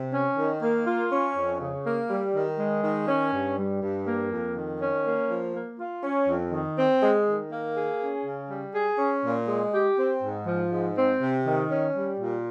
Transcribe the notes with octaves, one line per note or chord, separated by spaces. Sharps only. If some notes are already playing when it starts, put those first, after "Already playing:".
Already playing: C3
C#4
D#3
A#3
F4
C#4
F2
C#3
A#3
G3
D#3
G#3
D#3
C#4
G2
G3
G2
A#3
F2
D#3
C#4
A#3
F3
A#3
F4
C#4
F2
D#3
C4
G#3
D#3
A#3
G#4
C#4
C#3
G3
G#4
C#4
A#2
G#3
G4
C4
G#2
F3
G#2
C4
C3
D#3
C#4
G3
A#2